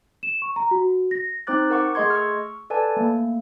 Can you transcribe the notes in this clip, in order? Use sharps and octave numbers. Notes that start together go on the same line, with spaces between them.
E7
C#6
A#5
F#4
A#6
C4 D#4 C5 D6 F#6 A6
A#4 F#5 C#6 D6
A3 G#4 D#5 C6 G#6
C#6 E6 F6
A4 B4 D5 G#5 A5
A3 A#3